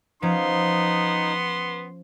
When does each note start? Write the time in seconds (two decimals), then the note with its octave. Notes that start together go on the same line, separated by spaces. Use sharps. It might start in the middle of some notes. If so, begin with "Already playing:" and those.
0.22 F3 B3 C#4 D#4 C6